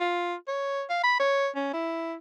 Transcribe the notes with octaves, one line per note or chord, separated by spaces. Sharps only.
F4
C#5
F5
B5
C#5
C#4
E4